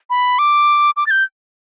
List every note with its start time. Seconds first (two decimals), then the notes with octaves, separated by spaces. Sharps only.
0.10 B5
0.39 D6
0.97 D6
1.07 A6
1.11 G6